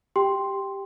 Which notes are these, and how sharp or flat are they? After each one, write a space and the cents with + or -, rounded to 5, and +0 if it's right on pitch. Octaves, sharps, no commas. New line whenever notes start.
G4 +0 G5 +5 C6 +0